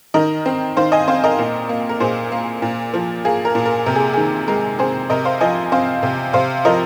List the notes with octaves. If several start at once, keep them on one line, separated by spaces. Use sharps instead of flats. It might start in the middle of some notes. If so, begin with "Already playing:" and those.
D#3 A#4 D#5
C4
D#3 C5 F5
D#5 G#5
C4 C5 F5
A#4 D#5
A#2
A#3
A#4
A#2 G#4 C5
A#3
A#2
F3
A#3 G#4
A#4
A#2
A#4
C3 A#4
G#4
D#3 G#4
G#3 A#4
C4 G#4 C5
C3 A#4 D#5
C5 F5
F3 D#5 G#5
C4 C5 F5
C3
C3 C5 F5
F3 A#4 D#5